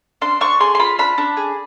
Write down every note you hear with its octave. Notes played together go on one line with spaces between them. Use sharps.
D4 C6
D4 C#6
G#4 C6
C6
F4 B5
D4 B5
D4
G#4